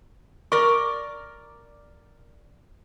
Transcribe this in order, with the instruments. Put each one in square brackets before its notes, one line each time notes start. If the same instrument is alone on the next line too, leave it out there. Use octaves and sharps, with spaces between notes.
[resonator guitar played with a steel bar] A#4 D5 [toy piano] C#6